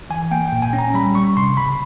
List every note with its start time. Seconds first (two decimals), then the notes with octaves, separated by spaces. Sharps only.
0.10 E3 G#5
0.31 A#3 G5
0.48 A#2 G5
0.62 G#5
0.73 C#4
0.79 A#5
0.94 G3 B5
1.15 G3 C#6
1.37 C3 C6
1.57 C#3 B5